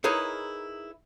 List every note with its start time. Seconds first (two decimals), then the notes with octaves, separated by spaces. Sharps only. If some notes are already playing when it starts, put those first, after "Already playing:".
0.04 D#4 E4 G#4 A#4 B4 C#5